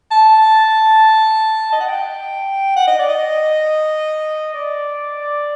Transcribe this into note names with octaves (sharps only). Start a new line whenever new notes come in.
A5
D#5
F#5
G5
F#5
D#5
D5
D#5
D5